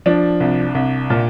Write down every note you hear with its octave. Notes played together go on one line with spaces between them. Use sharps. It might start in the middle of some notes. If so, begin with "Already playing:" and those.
F3 D4
C2
C2
A#2